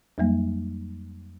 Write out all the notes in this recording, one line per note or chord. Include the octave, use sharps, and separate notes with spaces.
F2 F#3 G3 A#3